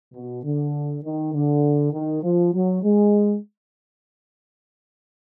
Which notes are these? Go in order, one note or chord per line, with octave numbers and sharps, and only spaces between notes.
B2
D3
D#3
D3
D#3
F3
F#3
G#3